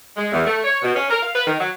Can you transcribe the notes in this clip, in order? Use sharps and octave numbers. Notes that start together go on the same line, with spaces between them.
G#3
E2
A3
C#5
B2
C#4
A#4
F5
B4
D#3
F#3